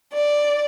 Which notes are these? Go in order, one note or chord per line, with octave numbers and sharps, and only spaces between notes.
D5